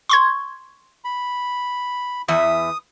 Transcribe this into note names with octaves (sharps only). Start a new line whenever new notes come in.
C6 C#6 G#6
B5
E2 E3 E5 D#6